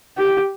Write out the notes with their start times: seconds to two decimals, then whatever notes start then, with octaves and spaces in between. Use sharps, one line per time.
0.17 G4